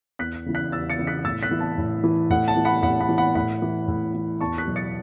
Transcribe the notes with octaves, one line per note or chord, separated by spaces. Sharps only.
E2 F#6 B6
C#3 E3
F#6 B6
E2 E6 A6
A6 C#7
C#3 E3
F#6 B6
A2 E6 A6
F#6 B6
E3
A5
A2
E3
A2 F#5
A5
E3
F#5 B5
A2 F#5 B5
F#5 B5
E3
F#5 B5
A2 F#5 B5
E3
A2
E3
E2 A5 C#6
F#6 B6
B2 F#3
A6 C#7